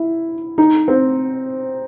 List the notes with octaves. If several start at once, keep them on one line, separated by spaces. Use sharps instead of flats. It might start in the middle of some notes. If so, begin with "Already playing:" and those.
Already playing: E4
D#4
C4